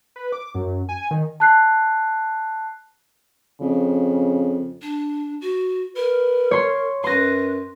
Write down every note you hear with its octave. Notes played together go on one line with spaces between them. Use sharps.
B4
D6
F#2
G#5
D#3
A5 F#6 C7
F2 C#3
D4
F#4
A#4 B4
C#5 C6
F#2 B4 C6 A#6